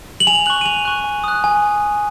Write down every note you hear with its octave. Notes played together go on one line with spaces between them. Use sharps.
F#7
G#5 F7
C#6 F#6 F#7
D#7
G#5 F7
C#6 F#6
G#5
D#6 F#6
G#5